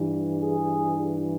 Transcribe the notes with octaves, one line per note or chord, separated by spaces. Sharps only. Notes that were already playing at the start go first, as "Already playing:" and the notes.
Already playing: G2 E3
G#4